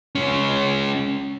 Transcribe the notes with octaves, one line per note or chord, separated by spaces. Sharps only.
G#3 C#4